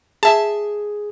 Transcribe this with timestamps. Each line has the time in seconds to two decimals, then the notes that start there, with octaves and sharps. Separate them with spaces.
0.23 G#4 E5 A5